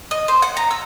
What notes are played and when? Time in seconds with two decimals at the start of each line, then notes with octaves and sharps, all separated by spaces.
0.11 D#5
0.28 C5
0.42 F#5
0.57 A#5
0.71 E6